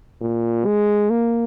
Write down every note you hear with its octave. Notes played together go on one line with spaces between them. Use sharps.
A#2
G#3
A#3